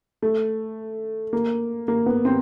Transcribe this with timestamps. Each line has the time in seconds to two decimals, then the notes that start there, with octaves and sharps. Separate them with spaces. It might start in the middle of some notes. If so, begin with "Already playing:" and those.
0.22 A3
1.33 A#3
1.88 A#3
2.06 B3
2.25 C4